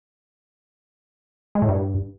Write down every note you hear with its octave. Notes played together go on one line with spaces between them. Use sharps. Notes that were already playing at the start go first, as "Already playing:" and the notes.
G#3
A2
G2